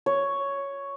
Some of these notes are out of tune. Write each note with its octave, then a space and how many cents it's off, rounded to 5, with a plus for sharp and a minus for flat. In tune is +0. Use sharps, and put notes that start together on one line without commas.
C#5 +5